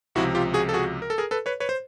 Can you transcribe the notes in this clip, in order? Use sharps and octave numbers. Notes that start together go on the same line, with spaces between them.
C#2 C3 F3 E4 F#4
F4 G4
F#4 G#4
A4
F#4 G#4
A#4
A4
G#4 A#4
A4 B4
B4 C#5
B4 C#5
C5